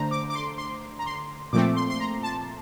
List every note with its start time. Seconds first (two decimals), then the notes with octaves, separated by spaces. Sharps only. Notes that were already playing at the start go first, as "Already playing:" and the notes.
Already playing: D3 A3 D4 C5 A#5
0.11 D6
0.30 D6
0.35 C6
0.58 C6
0.99 A#5
1.06 C6
1.53 A#2 F3 A3 C4 D6
1.76 C6
1.90 C6
2.00 A#5
2.23 A5